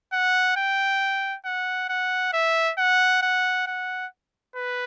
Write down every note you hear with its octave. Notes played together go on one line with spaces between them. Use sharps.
F#5
G5
F#5
F#5
E5
F#5
F#5
F#5
B4